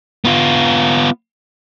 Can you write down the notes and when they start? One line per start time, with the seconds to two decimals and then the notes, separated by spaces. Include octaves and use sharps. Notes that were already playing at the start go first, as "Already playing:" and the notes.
0.25 B3 F4